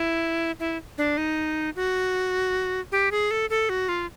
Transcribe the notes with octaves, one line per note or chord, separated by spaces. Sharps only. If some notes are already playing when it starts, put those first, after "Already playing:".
Already playing: E4
E4
D4
D#4
F#4
G4
G#4
A4
A4
F#4
F4